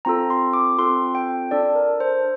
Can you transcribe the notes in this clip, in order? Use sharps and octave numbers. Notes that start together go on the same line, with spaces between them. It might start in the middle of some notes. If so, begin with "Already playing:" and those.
C4 F4 A4 A#5
C6
D6
C4 F4 A4 C6
G5
D4 A4 D5
A#4
C5